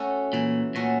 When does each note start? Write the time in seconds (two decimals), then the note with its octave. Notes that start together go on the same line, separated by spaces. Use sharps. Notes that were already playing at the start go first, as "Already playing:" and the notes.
Already playing: A3 C#4 F#4 A4
0.33 A#2 E3
0.75 A#2 A3 C#4 F#4 A4